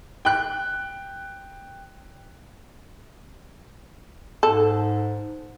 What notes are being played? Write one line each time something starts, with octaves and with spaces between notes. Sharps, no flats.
G5 F#6
G#2 A4